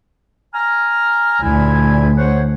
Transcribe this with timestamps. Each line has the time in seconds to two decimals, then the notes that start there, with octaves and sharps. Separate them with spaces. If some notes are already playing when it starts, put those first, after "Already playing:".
0.54 G#5 A#5 F6
1.43 D2 A#2 E4 G#5
2.18 C5 C#5 F#5